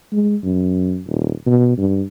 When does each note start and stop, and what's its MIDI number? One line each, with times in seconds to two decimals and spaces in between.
0.12 0.36 56
0.44 1.01 42
1.07 1.32 27
1.46 1.75 47
1.78 2.04 43